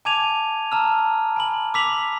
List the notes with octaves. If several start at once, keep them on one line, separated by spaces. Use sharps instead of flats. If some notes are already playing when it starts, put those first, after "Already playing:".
G#5 A5 D6 G#6 D#7 F7
A5 A#5 E6 F6
G#5 B5 F#7
D6 E6 B6 F7 F#7